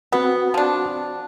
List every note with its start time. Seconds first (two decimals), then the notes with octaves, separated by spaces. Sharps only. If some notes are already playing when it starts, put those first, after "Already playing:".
0.12 B3 C4 F#4 F#5
0.54 F3 D4